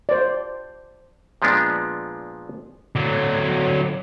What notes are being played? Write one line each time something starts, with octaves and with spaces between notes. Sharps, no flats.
C5 D5
A#2 F3 G#3 B3 D4
D3 F#3